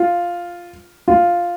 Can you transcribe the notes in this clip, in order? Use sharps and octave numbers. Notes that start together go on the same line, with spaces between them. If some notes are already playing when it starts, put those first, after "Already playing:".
Already playing: F4
F4